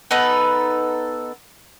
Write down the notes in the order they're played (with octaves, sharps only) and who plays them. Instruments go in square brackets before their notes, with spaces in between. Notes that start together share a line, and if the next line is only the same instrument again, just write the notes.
[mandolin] B3 D#4 A4 B4